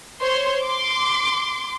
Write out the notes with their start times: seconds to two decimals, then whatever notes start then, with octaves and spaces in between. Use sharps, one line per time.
0.20 C5 C#5 C6
0.62 C6 D6